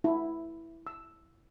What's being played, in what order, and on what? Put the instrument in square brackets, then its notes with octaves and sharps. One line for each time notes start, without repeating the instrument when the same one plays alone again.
[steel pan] E4
E6